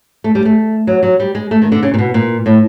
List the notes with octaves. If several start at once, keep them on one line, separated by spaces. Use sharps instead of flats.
A3
G3
A3
F#3
F#3
G3
G#3
A3
D#3
D3
C#3
A#2
B2
A#2
A2